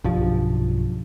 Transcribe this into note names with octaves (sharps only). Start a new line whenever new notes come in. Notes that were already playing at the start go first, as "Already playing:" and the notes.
B1 G2 F3